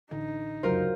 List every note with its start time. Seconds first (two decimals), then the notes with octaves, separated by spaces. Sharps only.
0.11 A1 D3 D#4
0.63 F1 C#2 F#2 F#3 F4 A#4 C5